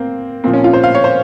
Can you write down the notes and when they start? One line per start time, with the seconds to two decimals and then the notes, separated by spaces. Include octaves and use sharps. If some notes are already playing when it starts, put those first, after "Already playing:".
Already playing: A#3 C4
0.44 A#2 F3 C4
0.54 C#4
0.64 F4
0.73 C5
0.83 F5
0.95 C#5
1.04 C5